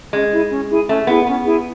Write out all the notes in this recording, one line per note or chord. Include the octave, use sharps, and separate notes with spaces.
G#3 C#4
E4 G#4
C#4
E4 G#4
A3 C#4
B3 E4 G#4
B3 C#4
E4 G#4